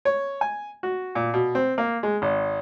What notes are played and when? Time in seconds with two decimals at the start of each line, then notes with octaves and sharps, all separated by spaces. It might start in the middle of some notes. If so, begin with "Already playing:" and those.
0.05 C#5
0.41 G#5
0.83 F#4
1.15 A#2
1.34 B2
1.55 C4
1.78 A#3
2.03 G#3
2.22 G#1